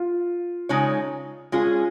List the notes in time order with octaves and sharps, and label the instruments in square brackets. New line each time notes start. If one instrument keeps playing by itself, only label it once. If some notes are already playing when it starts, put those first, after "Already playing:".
Already playing: [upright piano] F4
[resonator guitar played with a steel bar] C#3 G#3 D#4 C#5
[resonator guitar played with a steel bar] G#3 C#4 G#4 [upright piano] F4